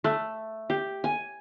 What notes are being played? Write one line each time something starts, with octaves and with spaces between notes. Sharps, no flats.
A3
G4
G#5